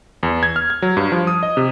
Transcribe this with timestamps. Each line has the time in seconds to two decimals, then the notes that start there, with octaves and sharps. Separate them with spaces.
0.23 E2
0.43 G#6
0.56 F6
0.70 G#6
0.82 F#3
0.97 G2
1.12 F3
1.27 D#6
1.43 D#5
1.57 C3